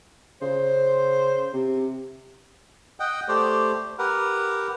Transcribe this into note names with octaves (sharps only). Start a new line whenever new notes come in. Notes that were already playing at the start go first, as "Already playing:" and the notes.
C#3 C5
C3
D#5 F#5 G5
A3 G4 C5 D5
G4 A#4 B4 F#5